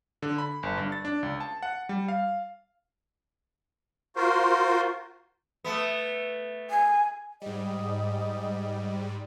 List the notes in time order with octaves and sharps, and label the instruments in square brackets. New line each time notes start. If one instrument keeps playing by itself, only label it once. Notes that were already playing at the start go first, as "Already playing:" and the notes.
[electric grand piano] D3
B5
G1
G2
A6
D4
C#2
A5
F#5
G3
F5
[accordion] F4 F#4 A#4 C5
[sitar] A3 B3
[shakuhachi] G#5
[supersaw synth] G#2 G3 [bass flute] D#5